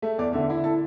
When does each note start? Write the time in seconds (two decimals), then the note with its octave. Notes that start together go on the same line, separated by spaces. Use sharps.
0.02 A3 E5
0.18 E2 D5
0.33 D3 E5
0.50 E4
0.64 A4 A5